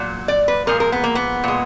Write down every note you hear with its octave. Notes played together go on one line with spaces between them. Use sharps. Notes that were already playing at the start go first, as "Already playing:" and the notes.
Already playing: A#2 F#3
D5
B4
A#2 F3 G#3 A#4
A#4
B3
A#3
B3
A#2 G#3